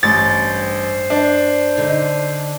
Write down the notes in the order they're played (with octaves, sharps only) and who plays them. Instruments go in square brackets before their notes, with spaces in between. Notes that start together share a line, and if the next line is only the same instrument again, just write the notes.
[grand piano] A1 [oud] G2 [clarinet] C5 [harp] A6
[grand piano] D4
[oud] D3 D#4